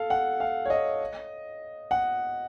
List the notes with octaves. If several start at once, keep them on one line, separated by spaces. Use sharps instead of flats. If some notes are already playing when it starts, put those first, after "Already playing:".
Already playing: A4 F5
F#5
F5
C#5
D#5
F#5